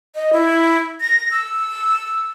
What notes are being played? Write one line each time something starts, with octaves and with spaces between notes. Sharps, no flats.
D#5
E4
A#6
E6